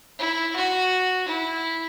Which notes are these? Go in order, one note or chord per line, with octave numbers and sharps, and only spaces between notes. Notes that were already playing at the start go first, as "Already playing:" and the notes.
E4
F#4
E4